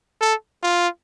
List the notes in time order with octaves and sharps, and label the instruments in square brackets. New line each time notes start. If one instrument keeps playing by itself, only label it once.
[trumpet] A4
F4